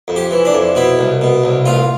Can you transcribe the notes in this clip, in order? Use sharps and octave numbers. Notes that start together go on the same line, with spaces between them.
F2
G4
E3
D4
F2
B2 E4
C2
B2
C2
A1 F4